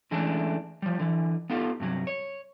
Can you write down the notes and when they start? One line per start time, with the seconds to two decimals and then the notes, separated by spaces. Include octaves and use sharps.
0.11 D3 E3 G#3 A3 C#4 D4
0.82 F3 G3
0.99 D3 E3
1.50 B3 D#4 F4 G4 A4
1.80 G2 C3 F#3
2.07 C#5